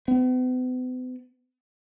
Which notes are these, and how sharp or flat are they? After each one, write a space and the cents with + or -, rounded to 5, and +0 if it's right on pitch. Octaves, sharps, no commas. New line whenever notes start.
B3 +45